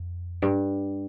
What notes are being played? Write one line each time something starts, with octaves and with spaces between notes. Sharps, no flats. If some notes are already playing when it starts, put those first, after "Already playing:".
Already playing: F2
G2